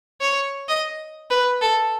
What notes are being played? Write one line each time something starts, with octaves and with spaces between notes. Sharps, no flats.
C#5
D#5
B4
A4